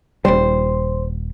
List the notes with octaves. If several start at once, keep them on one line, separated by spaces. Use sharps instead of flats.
D#1 G3 C5